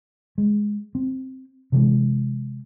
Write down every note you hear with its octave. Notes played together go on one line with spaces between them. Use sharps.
G#3
C4
C3 E3 G#3